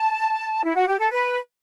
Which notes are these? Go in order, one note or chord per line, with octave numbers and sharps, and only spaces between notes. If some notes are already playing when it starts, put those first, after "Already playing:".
Already playing: A5
E4
F#4
G4
A4
B4